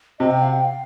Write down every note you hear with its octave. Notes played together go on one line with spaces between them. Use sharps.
C3 D#5
G5
F5
G5
F5